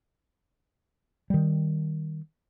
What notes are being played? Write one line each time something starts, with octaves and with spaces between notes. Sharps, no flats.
D#3 G3